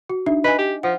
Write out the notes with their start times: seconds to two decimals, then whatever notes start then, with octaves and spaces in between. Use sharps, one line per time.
0.09 F#4
0.26 D4 D#4 E5
0.44 B4 D#5 G#5
0.58 G4
0.83 F3 F#5